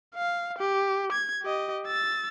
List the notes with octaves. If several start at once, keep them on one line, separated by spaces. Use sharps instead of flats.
F5
G4
G#6
G4 D#5
E6 A6